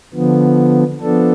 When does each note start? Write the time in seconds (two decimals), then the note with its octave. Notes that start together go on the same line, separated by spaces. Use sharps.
0.14 D3 F3 B3
1.01 F3 B3 D4 A4